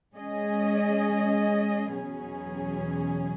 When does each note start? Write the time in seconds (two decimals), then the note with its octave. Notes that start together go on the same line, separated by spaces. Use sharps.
0.15 G#3 C#4 G#4 D#5
1.94 E2 B2 F#3 C#4 G#4